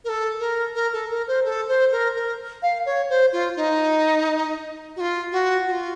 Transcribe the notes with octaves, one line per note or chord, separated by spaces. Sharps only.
A#4
A4
A#4
A#4
A4
A#4
C5
A4
C5
A#4
A#4
F5
C#5
C5
F4
D#4
F#4
F4
F#4
F#4
F4